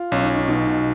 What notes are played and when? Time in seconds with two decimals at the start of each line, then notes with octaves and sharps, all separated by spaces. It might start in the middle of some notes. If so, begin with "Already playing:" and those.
Already playing: F4
0.12 B1 C#4
0.23 D#4
0.30 B1
0.36 D#4
0.48 B2 D#4
0.67 B2